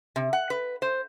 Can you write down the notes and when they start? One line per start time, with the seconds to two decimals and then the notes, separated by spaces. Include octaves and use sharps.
0.16 C3
0.33 F#5
0.50 B4
0.82 C5